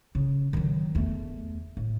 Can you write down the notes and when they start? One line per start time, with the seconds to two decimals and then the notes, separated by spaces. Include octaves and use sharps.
0.15 C#3
0.53 D#3 F#3
0.95 E2 A3
1.77 A2